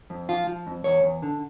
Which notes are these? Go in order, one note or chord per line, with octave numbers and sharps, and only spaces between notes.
F2
F3 F4
F3
F2
E2 C#5
E2
D3